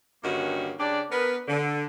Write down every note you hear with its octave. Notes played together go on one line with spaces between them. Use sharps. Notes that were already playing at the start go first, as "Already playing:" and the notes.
G2 D3 D#3 A#3 C#4 F#4
C#3 D4 G4 D5
B3 A#4 B4
D3